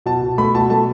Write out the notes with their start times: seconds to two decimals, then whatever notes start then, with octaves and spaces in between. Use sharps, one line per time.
0.06 B2 A5
0.22 B2
0.38 A3 B5
0.55 B2 A5
0.70 A3 A5